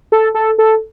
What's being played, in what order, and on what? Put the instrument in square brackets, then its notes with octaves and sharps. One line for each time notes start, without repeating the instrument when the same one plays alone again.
[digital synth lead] A4
A4
A4